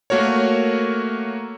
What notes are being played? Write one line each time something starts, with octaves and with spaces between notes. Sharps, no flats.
A3 A#3 F#4 A#4 C#5